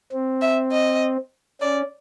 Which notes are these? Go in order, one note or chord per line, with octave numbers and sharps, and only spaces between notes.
C4
E5
D#5
C#4 D5